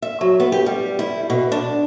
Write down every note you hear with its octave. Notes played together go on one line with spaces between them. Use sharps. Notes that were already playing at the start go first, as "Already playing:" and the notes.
E5
F#3
B3
G4
G3
E4
B2
D4